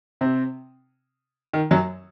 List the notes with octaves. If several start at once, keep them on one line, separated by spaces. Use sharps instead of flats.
C3 C4
D#3
F#2 F#3